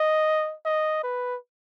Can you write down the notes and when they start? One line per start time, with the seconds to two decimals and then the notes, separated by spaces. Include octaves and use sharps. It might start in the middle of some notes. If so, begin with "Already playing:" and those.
Already playing: D#5
0.65 D#5
1.03 B4